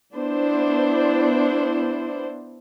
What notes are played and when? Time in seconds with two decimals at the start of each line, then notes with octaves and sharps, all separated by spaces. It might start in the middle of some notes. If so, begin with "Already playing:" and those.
0.15 B3 D4 E4 C5